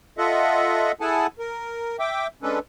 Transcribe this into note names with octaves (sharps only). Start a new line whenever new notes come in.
F4 A4 D#5 E5 F#5
E4 G#4 A4 F#5 G#5 A5
A#4
E5 G5 D6
G#3 C#4 D4 A4 B4